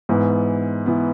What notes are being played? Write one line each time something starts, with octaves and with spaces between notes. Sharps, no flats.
G#2 E3 B3
E3 B3